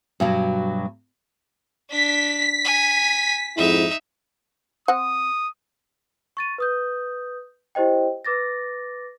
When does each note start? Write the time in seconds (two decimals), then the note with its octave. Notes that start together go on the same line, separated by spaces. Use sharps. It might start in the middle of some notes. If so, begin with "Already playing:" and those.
0.20 G2 B2 F#3
1.90 D4 B6
2.64 G#5
3.57 F2 G#2 D#4 E4 E5
4.88 C4 F#5 D#6
6.37 C#6 A6 D#7
6.58 B4 D#6 G6
7.75 E4 G4 C5 D#5 G5
8.25 B4 D6 A6 A#6